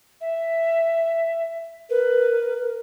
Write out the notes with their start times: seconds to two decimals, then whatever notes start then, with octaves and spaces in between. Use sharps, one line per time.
0.21 E5
1.90 A#4 B4